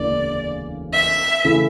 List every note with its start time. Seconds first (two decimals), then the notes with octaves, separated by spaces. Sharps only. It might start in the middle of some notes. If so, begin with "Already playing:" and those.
Already playing: E1 D2 C#3 E3 A#3 D5
0.94 E5
1.45 C#3 E3 A3 E4